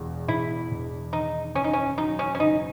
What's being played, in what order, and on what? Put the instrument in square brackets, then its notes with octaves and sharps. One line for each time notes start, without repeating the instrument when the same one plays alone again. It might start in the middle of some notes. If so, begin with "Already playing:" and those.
Already playing: [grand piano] E1 E2
[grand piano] E1 [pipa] E4
[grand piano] E1
[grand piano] D#3 [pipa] D#4
[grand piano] F#1 [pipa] C#4
[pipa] D#4
C#4
[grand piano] F#3 [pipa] D#4
[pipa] C#4
C#4
[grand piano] F#1 [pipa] D#4